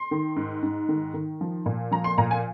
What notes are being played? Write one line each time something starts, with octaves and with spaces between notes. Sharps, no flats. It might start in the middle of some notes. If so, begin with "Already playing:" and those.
Already playing: C6
D#3
G#2
G#2
D#3
D#3
F3
A#2
F3 A#5
C6
A#2 A#5
G#5